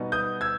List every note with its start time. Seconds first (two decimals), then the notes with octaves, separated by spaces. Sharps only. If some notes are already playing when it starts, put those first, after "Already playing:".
Already playing: B2 G3 B3 D#4
0.12 D#6 G6
0.41 E6 G#6